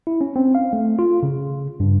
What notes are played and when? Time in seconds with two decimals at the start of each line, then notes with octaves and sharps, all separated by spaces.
0.07 E4
0.21 C#4
0.36 C4
0.55 F5
0.73 A3
0.99 F4
1.23 C#3
1.80 G2